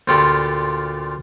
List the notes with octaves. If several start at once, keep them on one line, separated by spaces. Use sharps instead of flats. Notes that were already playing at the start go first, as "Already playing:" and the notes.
D2 A#2 F4 G4 A4 B5